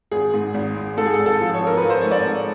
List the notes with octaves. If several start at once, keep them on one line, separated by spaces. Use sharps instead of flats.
G#1 G#4
G#2
G#1
G#1
G#2 A4
G#4
A4
G#1
A4
F3
C#5
F3
A#4
B4
F3
C5
G#2 C#5
D5
G#2